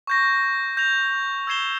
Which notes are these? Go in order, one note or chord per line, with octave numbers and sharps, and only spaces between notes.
C#6 G6 A#6
G6 A#6 F7
E6 G#6 C7 E7 G7